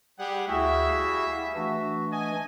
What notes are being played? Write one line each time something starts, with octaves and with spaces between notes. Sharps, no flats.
G3 G4 G#4 F#5
D2 G3 E4 F#4 G#4 E5
F5
E3 A3 D4 F#4
D#5 G#5